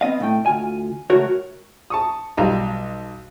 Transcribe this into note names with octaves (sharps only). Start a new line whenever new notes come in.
B3 C4 D#5 F5
A2 A3 G5
D2 F4 G#5
C#2 A3 F#4 A#4 C#5
A5 C#6 D#6
B1 G3 F4 A#5